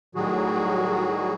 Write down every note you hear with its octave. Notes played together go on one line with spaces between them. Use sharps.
A2 D#3 F#3 G3 F#4 G#4